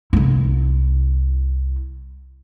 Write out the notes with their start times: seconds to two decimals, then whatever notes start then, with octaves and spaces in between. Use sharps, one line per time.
0.13 C2 E4